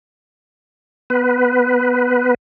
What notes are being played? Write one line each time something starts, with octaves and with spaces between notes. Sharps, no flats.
B3 B4